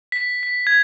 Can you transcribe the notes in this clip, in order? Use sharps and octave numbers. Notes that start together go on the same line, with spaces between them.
B6
B6
G#6